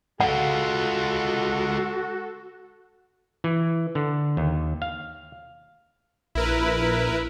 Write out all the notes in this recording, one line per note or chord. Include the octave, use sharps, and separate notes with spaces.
G#3 F4 F#4 A4 F#5
E3
D3
D#2
F5
A#1 E4 A#4 B4